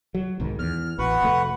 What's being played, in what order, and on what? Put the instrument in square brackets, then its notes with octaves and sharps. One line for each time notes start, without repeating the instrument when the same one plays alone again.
[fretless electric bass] F#3
B1 G#2 D#3
[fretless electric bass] E2 [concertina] F6
[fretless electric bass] A1 [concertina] F#4 B4 F#5
[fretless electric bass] F1 A3